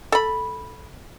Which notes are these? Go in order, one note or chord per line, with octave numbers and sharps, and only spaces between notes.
A4 B5